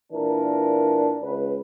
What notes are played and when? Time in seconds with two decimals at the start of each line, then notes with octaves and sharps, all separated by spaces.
0.13 A#2 E3 D4 A#4
1.22 C#2 B4